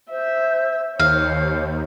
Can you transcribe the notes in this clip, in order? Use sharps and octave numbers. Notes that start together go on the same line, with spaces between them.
C5 E5
D#2 C5 C#5 F5